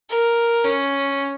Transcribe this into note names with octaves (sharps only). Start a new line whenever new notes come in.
A#4
C#4